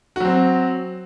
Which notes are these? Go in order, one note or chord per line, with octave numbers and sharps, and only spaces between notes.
F#3 C4 F#4